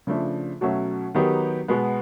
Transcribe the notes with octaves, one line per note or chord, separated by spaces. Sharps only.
C#3 F3 A3 D4
B2 F#3 A3 C#4
D#3 F#3 B3 D#4 G4
B2 G#3 B3